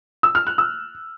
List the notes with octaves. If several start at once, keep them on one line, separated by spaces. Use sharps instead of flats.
E6
F6
F#6
E6